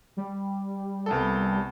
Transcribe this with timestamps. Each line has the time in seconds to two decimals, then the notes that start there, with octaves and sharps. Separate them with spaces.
0.17 G3
1.06 C2 B3 A4